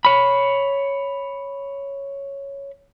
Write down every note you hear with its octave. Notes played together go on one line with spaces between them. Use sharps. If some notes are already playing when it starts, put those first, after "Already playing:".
C#5 B5